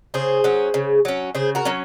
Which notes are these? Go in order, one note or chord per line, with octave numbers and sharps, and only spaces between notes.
C#3 G#4 C5
F#3 C#4
C#3
F#3 C#4
C#3 G#4 C5
F#4 A#4
F#3 C#4